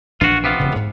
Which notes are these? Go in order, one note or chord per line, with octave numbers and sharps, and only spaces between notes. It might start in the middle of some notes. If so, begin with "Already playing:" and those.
A#1 E3 D4 F4 F#4
C3 B3 F4
E1 C#3
G#2